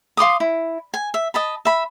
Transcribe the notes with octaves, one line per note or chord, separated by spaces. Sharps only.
F5 C6 D6 D#6
E4
G#5
E5
D#5 A5 B5
E5 B5